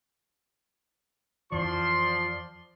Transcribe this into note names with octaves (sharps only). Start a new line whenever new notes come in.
F2 E3 F3 D5 C6